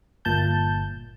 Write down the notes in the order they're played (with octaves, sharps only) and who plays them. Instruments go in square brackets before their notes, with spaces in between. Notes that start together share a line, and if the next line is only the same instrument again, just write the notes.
[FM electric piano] G1 A#2 A5 G6